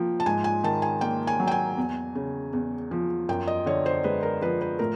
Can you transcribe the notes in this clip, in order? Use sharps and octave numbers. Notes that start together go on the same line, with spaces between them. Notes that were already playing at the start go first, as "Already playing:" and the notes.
Already playing: F3 A#3 G5
A5
G#2 G#5
G#5
D#3 A5
G#5
A#3 G5
G#5
F#3
G5
G#5
E2
C#3
E2
F3
F#2 G5
D#5
D3 C#5
C5
G#3 B4
A#4
F3 B4
B4
A2 A#4